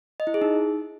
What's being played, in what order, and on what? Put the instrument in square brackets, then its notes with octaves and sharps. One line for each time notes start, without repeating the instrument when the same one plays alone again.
[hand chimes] D#5
E4
G#4
D#4